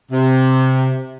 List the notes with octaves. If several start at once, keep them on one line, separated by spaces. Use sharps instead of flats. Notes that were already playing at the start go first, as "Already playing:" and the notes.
C3